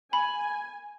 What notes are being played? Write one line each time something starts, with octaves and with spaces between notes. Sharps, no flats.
G#5 B5